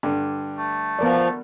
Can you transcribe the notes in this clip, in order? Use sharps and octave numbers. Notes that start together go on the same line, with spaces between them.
G2 D3
A3
F3 B3 A#4 D5